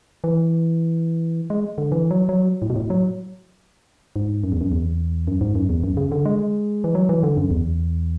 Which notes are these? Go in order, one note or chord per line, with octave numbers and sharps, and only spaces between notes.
E3
G#3
D3
E3
F#3
F#3
A2
B2
A2
F#3
G#2
F#2
E2
F#2
E2
F#2
G#2
F#2
E2
F#2
C#3
D3
G#3
E3
F#3
E3
D3
F#2
E2